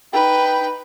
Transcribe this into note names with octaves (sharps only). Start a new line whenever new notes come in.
D#4 B4 G5